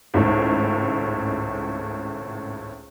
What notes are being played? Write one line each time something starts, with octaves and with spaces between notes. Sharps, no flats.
G#1 C#2 A2